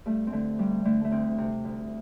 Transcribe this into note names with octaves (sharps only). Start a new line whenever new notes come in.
G2 A3
C4
D3 A3
G2 G3
D3 A3
A3
D2 C4
C3
D2